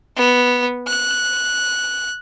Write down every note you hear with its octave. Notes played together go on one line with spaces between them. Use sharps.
B3
F#6